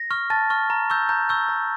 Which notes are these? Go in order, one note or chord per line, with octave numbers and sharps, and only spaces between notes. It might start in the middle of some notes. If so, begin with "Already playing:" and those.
Already playing: A#6
C#6 F6
A5 A6
C#6 F6
A#5
C#6 E6 G6
A#5 G6
C#6 E6 G6
A#5